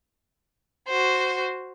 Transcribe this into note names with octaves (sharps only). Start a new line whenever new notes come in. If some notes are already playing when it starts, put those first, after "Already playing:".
F#4 C5